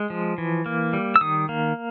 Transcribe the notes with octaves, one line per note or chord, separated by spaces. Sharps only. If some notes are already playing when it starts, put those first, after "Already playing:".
Already playing: G#3
F3
E3
A#3
G3
E6
D#3 D#6
A#3